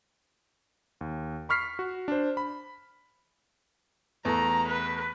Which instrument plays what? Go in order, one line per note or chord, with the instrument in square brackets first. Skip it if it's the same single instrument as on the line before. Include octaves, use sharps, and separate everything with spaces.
[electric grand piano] D#2
B5 C#6 F6 B6 C7
F#4
D4 C5
B5
[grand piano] E2 A3 [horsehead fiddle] A#5
[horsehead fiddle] B4